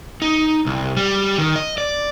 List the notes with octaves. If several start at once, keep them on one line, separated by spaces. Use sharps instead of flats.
D#4
C2
G3
D#3
D#5
D5